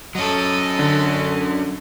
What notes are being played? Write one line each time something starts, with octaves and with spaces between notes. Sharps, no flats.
F#3 C#4 A4 D#5
D3